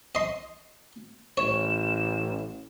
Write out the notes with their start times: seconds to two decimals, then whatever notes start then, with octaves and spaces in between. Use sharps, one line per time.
0.15 D#5 C6
1.37 A1 C#5 E7